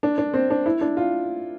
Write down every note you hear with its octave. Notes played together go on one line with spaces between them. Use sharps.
D4
D4
C4
D4
E4
D4
F4